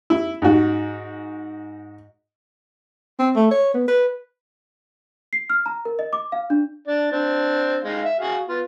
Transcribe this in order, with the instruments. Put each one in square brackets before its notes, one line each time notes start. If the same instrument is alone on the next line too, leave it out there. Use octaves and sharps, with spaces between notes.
[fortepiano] E4
G#2 F#4
[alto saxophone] C4
A3
C#5
B3
B4
[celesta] C7
F6
A#5
A#4
D#5
D6
F5
D4
[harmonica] D4 D5
C4 D4
G#3 D#4 F5
E5
F#4 G#4 F5
B3 F4